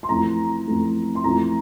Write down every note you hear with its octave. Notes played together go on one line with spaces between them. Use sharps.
C6
F2 E3 A3 A#5
F2 E3 A3
C6
F2 E3 A3 A#5